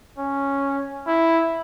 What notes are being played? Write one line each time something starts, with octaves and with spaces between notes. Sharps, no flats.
C#4
E4